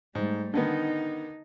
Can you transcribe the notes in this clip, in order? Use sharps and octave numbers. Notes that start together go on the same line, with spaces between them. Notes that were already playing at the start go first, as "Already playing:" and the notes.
G#2 G3 A3
D3 D#3 B3 D#4